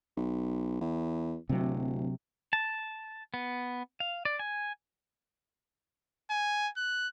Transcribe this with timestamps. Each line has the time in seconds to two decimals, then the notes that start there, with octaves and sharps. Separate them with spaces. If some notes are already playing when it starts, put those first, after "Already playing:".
0.17 B1
0.81 E2
1.49 D1 C3 F#3
2.53 A5
3.34 B3
4.00 F5
4.25 D5
4.39 G#5
6.30 G#5
6.77 F#6